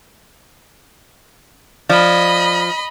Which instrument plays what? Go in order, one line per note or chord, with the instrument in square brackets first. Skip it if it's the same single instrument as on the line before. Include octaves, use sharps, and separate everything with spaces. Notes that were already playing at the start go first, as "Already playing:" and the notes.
[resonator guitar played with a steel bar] F3 [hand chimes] D5 [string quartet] D#5 B5